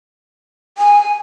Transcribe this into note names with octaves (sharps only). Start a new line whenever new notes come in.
G#5